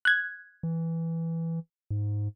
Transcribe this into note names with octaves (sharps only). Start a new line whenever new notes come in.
F#6 G#6
E3
G#2